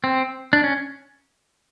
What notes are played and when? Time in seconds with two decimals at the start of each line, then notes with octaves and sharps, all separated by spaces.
0.04 C4
0.53 D4
0.64 C#4